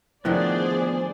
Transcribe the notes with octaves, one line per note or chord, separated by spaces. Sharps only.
A2 D3 D#3 F3 B3 G#4 C5 D5